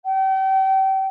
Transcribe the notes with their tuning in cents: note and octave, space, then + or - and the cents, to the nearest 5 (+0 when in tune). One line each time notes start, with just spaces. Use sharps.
G5 -35